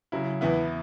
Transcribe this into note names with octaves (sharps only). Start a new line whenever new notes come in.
C#3 F#3 E4
E2 E3 B3 E4